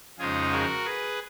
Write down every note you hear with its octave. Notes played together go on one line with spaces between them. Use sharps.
F2 C#3 G#3 D#4 F4 G#4
F#4 A#4
G#4 B4